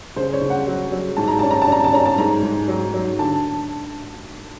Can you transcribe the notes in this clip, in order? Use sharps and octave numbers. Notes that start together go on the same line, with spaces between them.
C#3 C5
C#5
C#3
F#5
F#3
F#3
G#2 A5
A#5
C#4 A5
A#5
A5
C#4 A#5
A5
C#4 A#5
A5
G#2 A#5
G#2
F#3
F#3
D3 A5